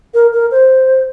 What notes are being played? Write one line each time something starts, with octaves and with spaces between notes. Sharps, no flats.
A#4
A#4
C5